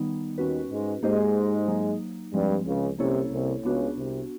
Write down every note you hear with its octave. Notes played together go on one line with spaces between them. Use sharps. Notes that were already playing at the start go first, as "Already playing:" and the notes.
Already playing: D#3 G3 B3 D#4
D#2 D#3 C#4 F#4 B4
G#2 G#3
G#2 G#3 A#3 D#4 G4 C5 D#5
F#3 A#3 D#4
G2 F3 G3 G#3 C4
C#2 C#3
C2 C3 A#3 C#4 E4 A4 C#5
C2 C3
C#2 C#3 B3 D4 F#4
C2 C3